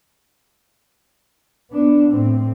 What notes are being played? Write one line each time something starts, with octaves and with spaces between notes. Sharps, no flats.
B3 D4
A2 C4